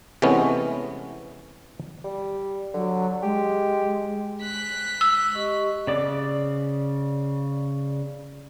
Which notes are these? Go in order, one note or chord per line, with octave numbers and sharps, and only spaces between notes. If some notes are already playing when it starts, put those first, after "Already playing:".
C3 E3 G#3 A3 B3 C#4
G3
D3 F#3
G#3 G4
G#3 F#6 B6
E6
G4 D#5 C#6
C#3 D5 D6